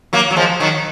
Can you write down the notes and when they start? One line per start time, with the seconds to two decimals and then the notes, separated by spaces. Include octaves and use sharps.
0.13 F#3 A#3
0.31 F#3
0.36 F3 G#3
0.60 D#3 F#3